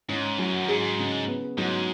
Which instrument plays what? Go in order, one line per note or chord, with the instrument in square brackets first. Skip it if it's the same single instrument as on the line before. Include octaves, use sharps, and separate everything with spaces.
[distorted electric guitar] G#2 [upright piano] C#4
[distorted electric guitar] F#2 [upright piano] F#3
[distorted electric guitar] G#2 [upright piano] G#4
[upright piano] C#3
B3
[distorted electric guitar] G#2 [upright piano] F#3